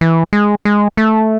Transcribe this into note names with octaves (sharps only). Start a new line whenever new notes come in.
E3
G#3
G#3
A3